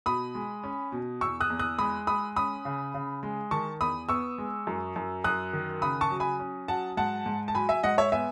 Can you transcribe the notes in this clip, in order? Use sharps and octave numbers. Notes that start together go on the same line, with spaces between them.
B2 B5 D#6
G#3
C#4
B2
E2 C#6 E6
D#6 F#6
E2
D#6 F#6
G#3 B5 D#6
G#3 B5 D#6
C#4 B5 D#6
C#3
C#3
G#3
D#3 A5 C#6
E2 B5 D#6
B3 C#6 E6
G#3
F#2
F#2
F#2 D#6 F#6
D#3
C#3 B5 D#6
A5 C#6
F#3
G#5 B5
C#4
F#3 F#5 A5
G#2 F#5 A5
G#2
A5
F#3 G#5 B5
E5 G#5
G#2 D#5 F#5
C#5 E5
B3 E5 G#5